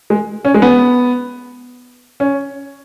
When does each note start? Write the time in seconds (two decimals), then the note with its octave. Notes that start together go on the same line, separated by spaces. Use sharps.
0.10 G#3
0.45 C#4
0.54 G#3
0.62 B3
2.20 C#4